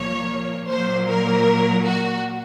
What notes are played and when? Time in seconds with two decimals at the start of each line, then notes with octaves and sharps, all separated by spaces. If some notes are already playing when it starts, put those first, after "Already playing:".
Already playing: C2 A#2 F3 A#3 C#5
0.69 A#2 F#3 A#3 C5
1.07 A#4
1.85 F#4